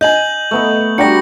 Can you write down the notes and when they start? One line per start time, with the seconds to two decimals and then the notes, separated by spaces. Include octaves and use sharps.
0.01 D#5 G#5 G6 F#7
0.51 A3 B3 D#4
0.98 G3 D4 F#4 D5 G5 A#5 A#6 C#7